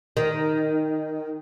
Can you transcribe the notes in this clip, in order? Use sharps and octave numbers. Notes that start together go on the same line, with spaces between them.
D#3